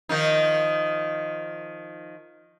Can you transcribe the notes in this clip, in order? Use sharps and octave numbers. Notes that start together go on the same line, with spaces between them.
D#3 F3 D#4